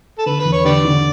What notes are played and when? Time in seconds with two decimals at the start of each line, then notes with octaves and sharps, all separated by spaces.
0.18 A4
0.26 D3 B4
0.40 B4
0.45 E2
0.53 C#5
0.65 D3 G4 B4 D5
0.85 D3